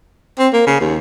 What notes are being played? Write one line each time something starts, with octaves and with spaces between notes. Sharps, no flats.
C4
A#3
C#3
D#2